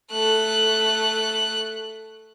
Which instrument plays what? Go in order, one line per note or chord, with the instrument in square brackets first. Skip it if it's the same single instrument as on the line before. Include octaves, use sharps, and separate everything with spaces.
[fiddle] A3 F#6